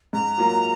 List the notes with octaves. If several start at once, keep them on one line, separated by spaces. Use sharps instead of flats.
G#2 A#5
F#3 A#3 F4